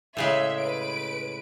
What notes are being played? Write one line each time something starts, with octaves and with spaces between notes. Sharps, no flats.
A2 C#3 G#3 E5
B4 D7